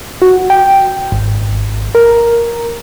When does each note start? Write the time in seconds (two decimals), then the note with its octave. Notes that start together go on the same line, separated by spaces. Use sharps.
0.22 F#4
0.50 G5
1.12 G#1
1.95 A#4